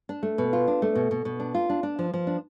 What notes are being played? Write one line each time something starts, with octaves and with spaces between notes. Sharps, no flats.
D4
A3
B2
F4
D4
A3
B2
B2
B2
D4
F4
D4
D4
F3
F3
D4